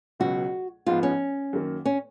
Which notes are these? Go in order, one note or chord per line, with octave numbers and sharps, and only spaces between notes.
C#2 B2 F#3 F#4
G#2 F3 B3 F4
C#4
F#2 D#3 A#3
C#4